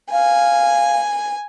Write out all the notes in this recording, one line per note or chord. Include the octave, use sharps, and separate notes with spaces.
F5 G#5